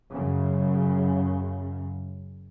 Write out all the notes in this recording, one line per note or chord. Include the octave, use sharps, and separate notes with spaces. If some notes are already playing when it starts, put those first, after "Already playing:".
F#2 C#3